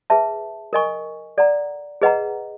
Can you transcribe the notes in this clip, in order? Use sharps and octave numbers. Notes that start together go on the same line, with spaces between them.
G#4 B4 E5 A5
A#4 D#5 G#5 C#6
A4 D5 F#5 A#5
G#4 B4 D#5 F#5 A#5